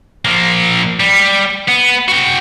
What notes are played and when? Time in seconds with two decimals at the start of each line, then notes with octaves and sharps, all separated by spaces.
0.25 F3 A#3
1.00 G3
1.68 B3
2.08 F#4 G5